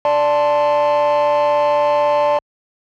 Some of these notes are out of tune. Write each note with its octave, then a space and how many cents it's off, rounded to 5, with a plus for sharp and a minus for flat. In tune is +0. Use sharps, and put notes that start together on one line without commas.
D5 +0 A5 +0 C6 +0